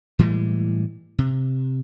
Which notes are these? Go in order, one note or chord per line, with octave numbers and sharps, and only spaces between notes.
A2 E3 G3 G#3
C3